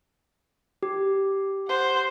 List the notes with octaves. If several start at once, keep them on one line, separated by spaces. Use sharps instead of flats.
G4
C5 F#5